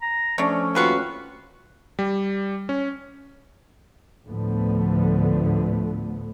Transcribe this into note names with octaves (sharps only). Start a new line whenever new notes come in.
A#5
F3 A3 C#4 D4 C#5
D#2 C3 F4 F#4 B4 C#6
G3
C#4
D2 A2 D3 F3 A3 B3